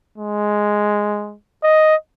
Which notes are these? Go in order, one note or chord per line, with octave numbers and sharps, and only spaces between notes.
G#3
D#5